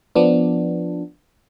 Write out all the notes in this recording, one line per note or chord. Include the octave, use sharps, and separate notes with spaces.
F3 B3 D4